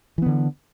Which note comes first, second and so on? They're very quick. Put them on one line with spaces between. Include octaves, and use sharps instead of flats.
E3 B3 D3